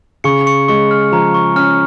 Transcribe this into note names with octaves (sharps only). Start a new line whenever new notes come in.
C#3 C#6 C#7
C#6 C#7
G#3 C#6 C#7
F6
F3 A#5
C#6
C#4 F6